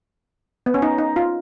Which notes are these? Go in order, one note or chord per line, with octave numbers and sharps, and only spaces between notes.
B3
C#4
D#4
D#4
F4